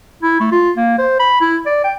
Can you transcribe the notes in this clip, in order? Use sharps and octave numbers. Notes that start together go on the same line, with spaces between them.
E4
A3
F4
A#3
C5
B5
E4
D5
G5